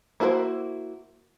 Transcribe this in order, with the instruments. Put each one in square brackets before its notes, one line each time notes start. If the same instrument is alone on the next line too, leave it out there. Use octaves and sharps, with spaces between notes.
[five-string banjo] A#3 E4 F#4 A#4 C5